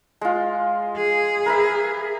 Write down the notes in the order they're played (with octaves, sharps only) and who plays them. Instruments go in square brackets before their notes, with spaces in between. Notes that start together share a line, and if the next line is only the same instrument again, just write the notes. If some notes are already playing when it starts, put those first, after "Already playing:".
[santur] G#3 F4
[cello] G#4
[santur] A#4 B4 E5